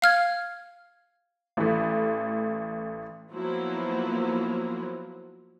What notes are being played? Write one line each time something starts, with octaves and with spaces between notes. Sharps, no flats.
F5 F6 G#6
A1 E3 A3
F3 F#3 A#3 B3 E4